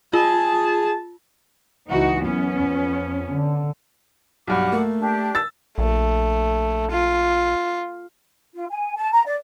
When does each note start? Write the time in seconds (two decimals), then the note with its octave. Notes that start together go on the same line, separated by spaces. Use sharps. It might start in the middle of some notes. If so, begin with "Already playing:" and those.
0.13 F4 G#4 A5
1.88 C#2 E3 D#4 F#4
2.23 F#2 B3 C#4
2.58 F2
3.32 D3
4.47 B1 G2 F#5 D6
4.72 A3 A#3
4.99 D4 G4
5.35 E6 A6
5.78 A#1 A3
6.91 F4
8.54 F4
8.69 G#5
8.95 A5
9.12 A#5
9.26 D5